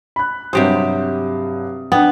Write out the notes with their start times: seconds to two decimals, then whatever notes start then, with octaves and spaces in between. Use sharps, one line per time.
0.16 B5 F#6
0.53 G2 C3 F#3 G4 C5 D#6
1.92 B3 D4 G5